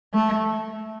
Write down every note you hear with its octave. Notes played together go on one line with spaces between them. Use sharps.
A3